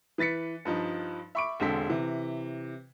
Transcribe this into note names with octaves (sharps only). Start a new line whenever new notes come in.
E3 B4 A6 B6 C#7
G2 F3 D#4 A5
E5 B5 C#6 D6 D7
E1 D3 G#3 C4 A4 B6
C3 E3